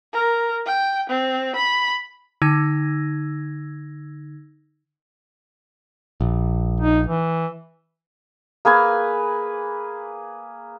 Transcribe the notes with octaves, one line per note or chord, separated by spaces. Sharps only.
A#4
G5
C4
B5
D3 D#4 E6 G#6 A#6
A#1
D#4
E3
A#3 G#4 B4 G#5